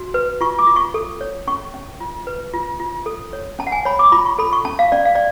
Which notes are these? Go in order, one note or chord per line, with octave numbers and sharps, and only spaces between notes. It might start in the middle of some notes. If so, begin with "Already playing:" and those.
Already playing: F#4
B4
F4 C#6
D6
F4
C#6
A4
C#5
C#4 C#6
C#4
F4
B4
F4
F4
A4
C#5
C#4 A5
F#5
G#5
C#5 B5
D6
F4 B5
C#6
A4 B5
C#6
C#4 A5
F5
C#4 D5
F5
D5